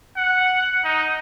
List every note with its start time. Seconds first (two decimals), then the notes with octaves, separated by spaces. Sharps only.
0.17 F#5
0.84 D#4